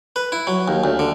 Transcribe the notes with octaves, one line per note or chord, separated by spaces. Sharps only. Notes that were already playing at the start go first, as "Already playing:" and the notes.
B4
E4
F#3
D#2
D2
D3